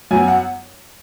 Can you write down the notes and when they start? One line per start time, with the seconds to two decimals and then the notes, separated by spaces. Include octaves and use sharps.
0.11 F#2 F#3 B3 G#5
0.28 F#5